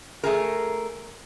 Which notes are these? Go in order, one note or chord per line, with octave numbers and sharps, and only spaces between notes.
A3 G#4 A#4